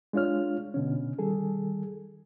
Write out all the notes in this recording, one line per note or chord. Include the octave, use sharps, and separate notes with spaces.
G#3 D4 F4 C#5 F6
B2 D3 C#4
D#3 G3 G#4 A4